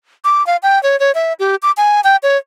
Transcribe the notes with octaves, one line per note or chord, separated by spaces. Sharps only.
D6
F5
G5
C#5
C#5
E5
G4
D6
G#5
G5
C#5